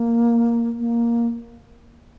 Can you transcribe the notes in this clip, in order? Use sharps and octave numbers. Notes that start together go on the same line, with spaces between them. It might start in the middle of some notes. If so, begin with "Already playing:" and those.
Already playing: A#3
A#3